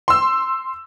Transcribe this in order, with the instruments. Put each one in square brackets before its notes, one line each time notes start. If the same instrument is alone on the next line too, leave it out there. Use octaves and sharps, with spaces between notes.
[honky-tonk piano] C6 E6